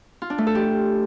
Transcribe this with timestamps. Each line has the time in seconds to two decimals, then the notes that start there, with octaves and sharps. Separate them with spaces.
0.22 F4
0.30 D4
0.38 A3
0.47 A4
0.55 G4